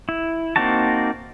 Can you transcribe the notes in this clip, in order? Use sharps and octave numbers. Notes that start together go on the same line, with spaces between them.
E4
A#3 C4 D#4 F#4 A5